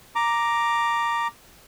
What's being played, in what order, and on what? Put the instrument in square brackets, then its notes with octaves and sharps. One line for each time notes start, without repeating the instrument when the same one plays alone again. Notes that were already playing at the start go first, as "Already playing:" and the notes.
[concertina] A#5 D6